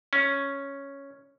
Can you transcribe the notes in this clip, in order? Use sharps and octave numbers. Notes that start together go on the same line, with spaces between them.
C#4